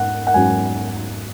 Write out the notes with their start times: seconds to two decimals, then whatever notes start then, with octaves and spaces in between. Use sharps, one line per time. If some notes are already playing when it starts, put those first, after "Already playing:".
Already playing: G#2 F#5
0.27 F#5
0.34 G#2 F#3 C#4 G#5